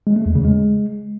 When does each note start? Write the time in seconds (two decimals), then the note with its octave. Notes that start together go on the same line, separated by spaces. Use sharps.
0.07 G#3
0.16 A3
0.26 E2
0.35 C#3
0.45 G#3